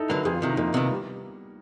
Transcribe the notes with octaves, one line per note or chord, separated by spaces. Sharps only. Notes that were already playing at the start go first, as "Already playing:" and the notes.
Already playing: D#4 E4 A4
D3 F#3 A#3 B4
F2 G#4
F4
C3 D#3 E4
D#4
F2 A#3
C3 D#3 B3
G3